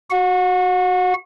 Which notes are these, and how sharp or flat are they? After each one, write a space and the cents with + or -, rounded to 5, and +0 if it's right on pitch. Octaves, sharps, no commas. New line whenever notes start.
F#4 +0 F#5 -35